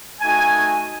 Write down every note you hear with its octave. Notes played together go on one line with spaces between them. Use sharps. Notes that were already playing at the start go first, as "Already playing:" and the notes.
A3 D#4 F#4 G#5